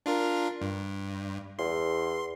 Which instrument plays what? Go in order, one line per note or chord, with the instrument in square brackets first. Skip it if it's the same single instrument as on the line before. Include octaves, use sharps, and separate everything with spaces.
[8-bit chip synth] D4 F4 A#4
G2
[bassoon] E2 [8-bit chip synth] C6